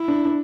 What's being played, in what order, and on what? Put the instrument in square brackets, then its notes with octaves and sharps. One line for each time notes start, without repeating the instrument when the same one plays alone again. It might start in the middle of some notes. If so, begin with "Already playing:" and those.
Already playing: [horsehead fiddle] E4
[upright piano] D4
D4